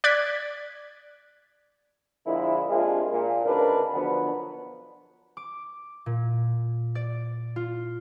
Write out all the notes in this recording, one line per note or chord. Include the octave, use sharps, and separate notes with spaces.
D5 F#6 G#6 B6
A#2 D3 F3 G#3 E4
C3 G#3 A#3 D4 F4 G#4
A#2
G#1 D2 C#3 D4 A#4 B4
B2 D3 F3 F#3 B3
D6
A#2
D5
F4